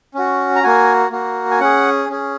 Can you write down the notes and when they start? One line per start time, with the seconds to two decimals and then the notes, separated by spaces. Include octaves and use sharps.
0.14 C#4 F#4
0.56 A#5
0.63 A#3 F#4 G#5
1.11 A#3 F#4
1.51 G#5
1.60 C#4 G#4 F#5
2.09 C#4 G#4